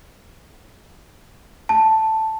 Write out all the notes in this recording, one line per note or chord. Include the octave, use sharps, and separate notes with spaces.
A5